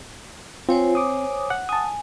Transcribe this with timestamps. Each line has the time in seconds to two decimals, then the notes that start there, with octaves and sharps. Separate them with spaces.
0.69 C4 F4 C5 C#5 G#5
0.95 D6 D#6
1.50 F#5
1.69 G#5 A5 D#6